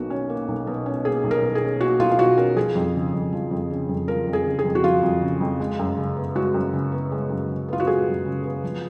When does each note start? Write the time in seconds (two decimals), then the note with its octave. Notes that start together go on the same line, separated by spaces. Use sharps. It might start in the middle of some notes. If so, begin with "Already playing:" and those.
Already playing: B1 B2 A#3 F#4
0.10 C#4
0.29 A#3
0.48 B1
0.67 B2
0.86 C#4
1.05 A#3 G#4
1.24 B1
1.31 A#4
1.43 B2
1.55 G#4
1.62 C#4
1.81 A#3 F#4
1.99 B1 F4
2.12 F4
2.19 B2 F#4
2.38 C#4 A#4
2.56 F3 G#4
2.75 F2
2.95 C#3
3.14 F2
3.32 F3
3.51 F2
3.70 C#3
3.89 F2
4.08 F3 A#4
4.27 F2
4.33 G#4
4.46 C#3
4.59 G#4
4.65 F2
4.75 F#4
4.84 F3 F4
5.03 F2
5.22 C#3
5.41 F2
5.60 G#3
5.79 F#2
5.97 C#3
6.17 B3
6.35 G#3 F#4
6.54 F#2
6.73 C#3
6.92 B3
7.12 G#3
7.30 F#2
7.49 C#3
7.68 B3 F4
7.80 F#4
7.87 G#3 G#4
8.07 F#2
8.25 C#3
8.44 B3
8.63 F3